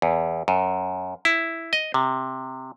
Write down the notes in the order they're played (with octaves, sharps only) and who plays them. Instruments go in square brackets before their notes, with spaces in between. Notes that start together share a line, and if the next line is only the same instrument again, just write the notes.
[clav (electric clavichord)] E2
F#2
E4
D#5
C3